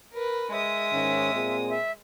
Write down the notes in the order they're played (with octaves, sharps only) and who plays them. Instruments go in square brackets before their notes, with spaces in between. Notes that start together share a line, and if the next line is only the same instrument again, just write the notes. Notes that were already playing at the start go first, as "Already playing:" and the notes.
[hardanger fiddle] A#4 B4
[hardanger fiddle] G#3 D#6 [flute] E5
[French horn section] G#2 D#3 C#4
A#2 C4 G#4
[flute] E5